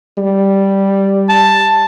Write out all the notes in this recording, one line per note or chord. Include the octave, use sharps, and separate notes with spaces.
G3
A5